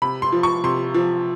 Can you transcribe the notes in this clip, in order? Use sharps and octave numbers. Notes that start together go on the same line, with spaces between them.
C3 B5
C6
F3
C#6
C3 C6
F3